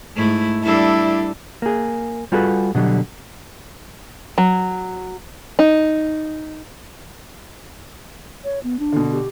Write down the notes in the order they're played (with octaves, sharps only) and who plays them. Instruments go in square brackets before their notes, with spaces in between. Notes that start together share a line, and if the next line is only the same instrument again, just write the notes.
[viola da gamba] G#2 A3 E4
[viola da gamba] G3 D4 A4 [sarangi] E4
[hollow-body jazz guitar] A#3 G#4
G3 F4 F#4 G#4 A4 B4
B2 D3 F#3 G3
[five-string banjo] F#3
D#4
[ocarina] C#5
B3
D4
[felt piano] B2 D3
[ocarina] G4